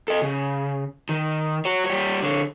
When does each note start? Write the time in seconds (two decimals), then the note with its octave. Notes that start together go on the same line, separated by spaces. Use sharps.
0.08 A4 D#5
0.22 C#3
1.09 D#3
1.65 F#4 C#5
1.86 G3 C#5
2.23 D3 C#5